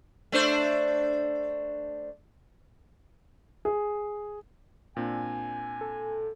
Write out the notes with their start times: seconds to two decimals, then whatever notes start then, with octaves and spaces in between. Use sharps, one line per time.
0.32 A3 D4 C5
3.65 G#4
4.97 A#2 C4 D4 G#5
5.81 A4